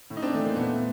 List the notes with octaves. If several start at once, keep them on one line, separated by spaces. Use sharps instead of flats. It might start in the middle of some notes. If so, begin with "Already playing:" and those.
A2
D#4
C4 D4
E3 A3
A#3
A#2 A3 B3